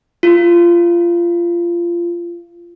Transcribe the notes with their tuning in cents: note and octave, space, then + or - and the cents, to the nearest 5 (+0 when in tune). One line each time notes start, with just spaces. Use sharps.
F4 -20